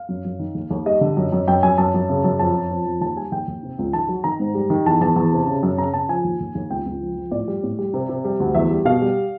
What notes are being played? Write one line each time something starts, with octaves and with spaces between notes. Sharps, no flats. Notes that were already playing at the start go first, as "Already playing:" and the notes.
Already playing: F5
F#2
F#2
D#3
D#2
D#2
G3 D#5
D3
F#2
F#2
F#2 G5
F#2 G#5
F#2 A5
F#2
C#3
F#2
F2 A5
F2
F2
F2
D#2 A5
G3 G#5
D#2 G5
D#2
C3
C#2
D#3 A5
F#3
D#3 A#5
G#2
G3
D#3
E2 A5
E2 A5
E2
C3
C#3
F#2
C#3 A#5
C#3 A5
F3 G#5
D#2
D#2
D#2
C#2 G5
C#2
F3
F3
A2 D5
G3
A2
G3
C3
C3
G3
D2
E2 E5
G3
B2 F5
G3